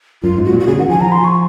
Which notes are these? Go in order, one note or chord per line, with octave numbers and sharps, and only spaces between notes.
F#2 F4
G#2
F#4
A#2
F#4
C#3 G#4
D#3 F#5
F3 G#5
F3 A#5
C6
C#6